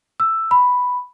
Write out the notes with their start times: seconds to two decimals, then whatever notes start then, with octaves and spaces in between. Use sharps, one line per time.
0.20 E6
0.51 B5